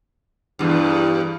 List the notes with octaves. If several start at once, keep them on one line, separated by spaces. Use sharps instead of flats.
E2 G2